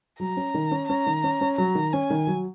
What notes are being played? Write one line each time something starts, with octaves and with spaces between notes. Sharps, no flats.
F#3 A#5
C#4
D#3
C#4
C#4 A#5
D#3
C#4
C#4
F#3 A#5
D#3
C#4 G#5
D#3
F#3